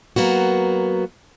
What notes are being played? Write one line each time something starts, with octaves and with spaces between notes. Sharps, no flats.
F#3 A#3 B3 F#4